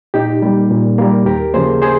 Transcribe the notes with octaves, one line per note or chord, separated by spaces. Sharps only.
A#2 D#4 G4
G3 A#3
A#2
G3 A#3
D#2 G4 A#4
C#3 F3 A#3 G#4 C5
G#4 C5